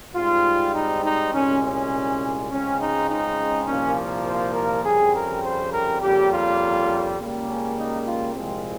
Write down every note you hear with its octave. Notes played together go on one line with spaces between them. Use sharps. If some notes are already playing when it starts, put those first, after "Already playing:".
G#2 G3 C4 F4
D#4
D#4
C2 A#2 G#3 C#4
C#4
C#2 C#3 G#3 C4 C#4
D#4
D#4
C2 A#2 F3 A#3 C#4
C5
A#4
F2 C#3 G3 C4 G#4
A#4
C5
A#4
F2 C#3 G3 A#3 G4
F4
C#2 C#3 G3 A#3
C#4
D#4
F4
C2 A#2 F3 G#3 C4